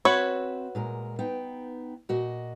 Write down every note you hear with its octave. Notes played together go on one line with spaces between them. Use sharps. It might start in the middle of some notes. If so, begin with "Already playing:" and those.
C4 F#4 B4 C#5 E5
A#2 G#3 A#4
B3 D#4 G5
A#2 F#4 D#5